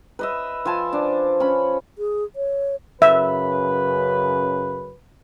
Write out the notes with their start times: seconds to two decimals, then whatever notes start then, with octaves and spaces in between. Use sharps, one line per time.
0.19 B4 D#5 E5
0.65 F3 C5 G#5 A5
0.93 D4
1.40 C#4 B5
1.98 G#4
2.36 C#5
3.02 F#2 C#3 B4 E5